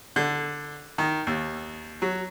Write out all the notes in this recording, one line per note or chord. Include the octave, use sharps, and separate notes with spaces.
D3
D#3
D#2
F#3